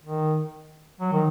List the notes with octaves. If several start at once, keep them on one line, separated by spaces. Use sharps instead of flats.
D#3
F#3
D#3